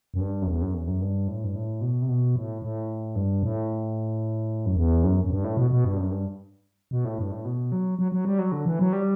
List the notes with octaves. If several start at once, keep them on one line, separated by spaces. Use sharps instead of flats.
F#2
G2
F#2
E2
F#2
E2
F#2
G2
A2
G2
A2
B2
C3
B2
A2
A2
G2
A2
F#2
E2
F#2
F#2
G2
A2
B2
B2
G2
F#2
G2
B2
A2
G2
A2
B2
F#3
F#3
F#3
G3
F#3
D3
E3
F#3
G3